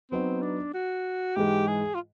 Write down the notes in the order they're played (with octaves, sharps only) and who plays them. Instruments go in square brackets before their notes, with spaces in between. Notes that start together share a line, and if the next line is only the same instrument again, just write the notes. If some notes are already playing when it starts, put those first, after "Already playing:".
[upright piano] F#3 B3 D#4 [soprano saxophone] C4
[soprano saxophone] D4
F#4
[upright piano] G#2 E3 G#3 [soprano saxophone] G4
[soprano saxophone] G#4
F4